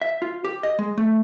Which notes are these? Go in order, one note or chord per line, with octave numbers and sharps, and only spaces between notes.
E5
F4
G4
D#5
G#3
A3